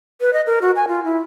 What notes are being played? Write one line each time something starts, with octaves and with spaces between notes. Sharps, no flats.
B4
D#5
A#4
F#4
G#5
F4
E4